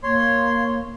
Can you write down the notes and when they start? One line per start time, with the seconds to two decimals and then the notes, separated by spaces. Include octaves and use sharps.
0.03 A#3 C#5 C6